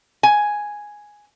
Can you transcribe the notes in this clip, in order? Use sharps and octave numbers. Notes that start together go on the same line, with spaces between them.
G#5